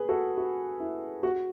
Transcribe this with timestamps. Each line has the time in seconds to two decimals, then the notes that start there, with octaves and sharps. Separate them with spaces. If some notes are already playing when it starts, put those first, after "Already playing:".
Already playing: G#4 B4
0.09 F#4 A4
0.38 F#4
0.80 E4
1.23 F#4